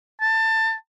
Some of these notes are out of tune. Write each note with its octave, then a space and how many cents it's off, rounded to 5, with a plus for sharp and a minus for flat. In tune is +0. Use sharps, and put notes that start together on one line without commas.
A5 +20